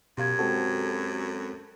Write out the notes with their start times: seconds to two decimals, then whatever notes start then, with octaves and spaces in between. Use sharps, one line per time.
0.18 F#2 B2 G4 F5 G#6
0.39 G#3 C4 F#4 A4